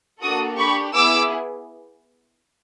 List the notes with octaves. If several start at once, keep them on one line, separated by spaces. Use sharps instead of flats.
A#3 D4 F#4 A4 C#6 D#6
D4 G4 B5 C#6
B3 E4 G#4 D6 E6